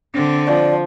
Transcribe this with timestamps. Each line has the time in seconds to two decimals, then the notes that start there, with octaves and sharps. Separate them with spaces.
0.14 D3 C4
0.47 F3 D5